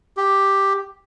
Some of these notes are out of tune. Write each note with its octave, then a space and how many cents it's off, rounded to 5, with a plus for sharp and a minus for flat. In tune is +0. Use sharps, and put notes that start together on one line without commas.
G4 +5